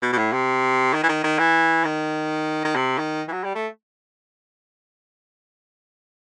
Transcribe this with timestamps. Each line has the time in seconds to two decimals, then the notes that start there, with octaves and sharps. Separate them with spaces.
0.02 B2
0.13 B2
0.18 A2
0.33 C3
0.93 D#3
1.03 E3
1.09 D#3
1.24 D#3
1.39 E3
1.84 D#3
2.64 D#3
2.75 C3
2.98 D#3
3.28 E3
3.32 F#3
3.44 G3
3.55 A3